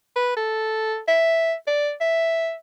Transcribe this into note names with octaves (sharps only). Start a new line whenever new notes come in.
B4
A4
E5
D5
E5